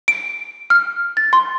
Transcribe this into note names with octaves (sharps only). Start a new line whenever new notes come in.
D7
F6
A6
C6